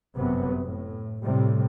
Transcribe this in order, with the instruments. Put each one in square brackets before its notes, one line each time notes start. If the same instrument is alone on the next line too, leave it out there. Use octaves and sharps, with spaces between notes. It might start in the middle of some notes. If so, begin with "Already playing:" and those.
[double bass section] G1 F#2 C3 B3
A2
A2 C3 G3